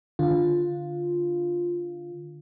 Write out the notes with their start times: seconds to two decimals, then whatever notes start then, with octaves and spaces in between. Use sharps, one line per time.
0.19 D3 F4